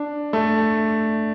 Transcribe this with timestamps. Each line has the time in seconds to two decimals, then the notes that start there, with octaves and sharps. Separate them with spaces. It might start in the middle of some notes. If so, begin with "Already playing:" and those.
Already playing: D4
0.33 A3